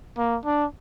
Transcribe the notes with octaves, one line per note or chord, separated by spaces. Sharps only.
A#3
D4